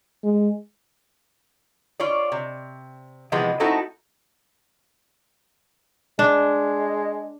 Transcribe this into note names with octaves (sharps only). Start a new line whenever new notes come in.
G#3
F4 C#5 D5
C3
C3 E3 F3 G#3 B3
A3 C4 D#4 E4 F#4 A4
G#3 D4